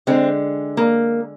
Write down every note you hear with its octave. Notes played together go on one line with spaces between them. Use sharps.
D3 G#3 C4
A#3